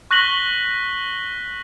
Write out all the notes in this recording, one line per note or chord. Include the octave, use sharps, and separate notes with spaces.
C#6 F#6 A#6 B6 F#7 G7